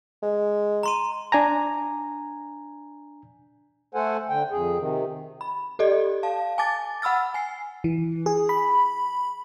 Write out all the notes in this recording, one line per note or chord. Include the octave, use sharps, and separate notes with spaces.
G#3
A#5 C6 D#7
D4 G#5 A#5
A3 A4 C5 F#5 G#5
D3 G5
F2 G#4
C3 D#3
B5
G4 A4 D5 D#5
F5 A5
G#5 A5 D6 A6
F#5 B5 E6 F6 A6
G#5 C7
E3
G#4
B5